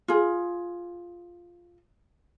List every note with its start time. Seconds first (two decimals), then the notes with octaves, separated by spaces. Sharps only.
0.08 F4 G#4